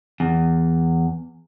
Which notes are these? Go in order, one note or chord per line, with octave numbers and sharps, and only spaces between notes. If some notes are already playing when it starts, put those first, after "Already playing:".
E2